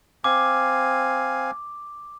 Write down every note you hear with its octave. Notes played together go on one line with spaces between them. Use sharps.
C4 F5 G#5 D6